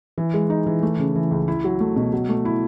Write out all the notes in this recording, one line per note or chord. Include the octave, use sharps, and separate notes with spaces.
E3
G#3
D#4
E3
A3
C#3
E3
C#2
E4
F#3
A3
B2
F#3
A3
E4